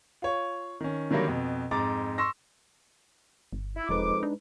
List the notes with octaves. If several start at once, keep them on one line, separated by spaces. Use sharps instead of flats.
F4 C#5
D#3 C#4
D3 D#3 F#3 G3 A#3
F2 B2
F2 G#2 A#5 D6 A6
C6 C#6 E6 A#6
G1
E4
E1 F2 F3 G#3 D#4 B4 D6
D4